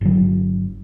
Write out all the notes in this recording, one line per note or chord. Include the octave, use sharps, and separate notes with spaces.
G1 F#3